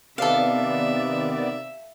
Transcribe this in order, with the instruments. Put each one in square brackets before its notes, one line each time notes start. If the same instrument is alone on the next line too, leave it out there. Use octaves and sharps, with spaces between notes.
[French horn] C3 [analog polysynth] D#3 B3 D5 [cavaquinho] A4 F5 [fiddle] E5